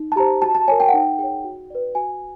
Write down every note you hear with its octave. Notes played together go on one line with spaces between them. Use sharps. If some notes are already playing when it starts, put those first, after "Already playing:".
Already playing: D#4
A5
G4 C5 A#5
F#4 A5
A5
A#4 C#5 G#5
G5
F#5
D#4 G5
G#4 C#5 G5
F#4
B4 D5
F#4 G#5